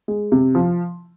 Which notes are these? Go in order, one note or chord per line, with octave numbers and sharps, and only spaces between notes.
G#3
C3
F3